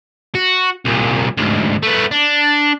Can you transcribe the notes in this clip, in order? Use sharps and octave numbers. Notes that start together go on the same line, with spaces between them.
F#4
C2 A#2
D2 G#2
A3 B3
D4